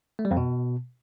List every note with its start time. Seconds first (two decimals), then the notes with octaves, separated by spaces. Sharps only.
0.19 A3
0.25 G3
0.31 F2
0.37 B2